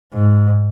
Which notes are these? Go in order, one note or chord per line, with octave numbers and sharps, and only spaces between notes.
G#2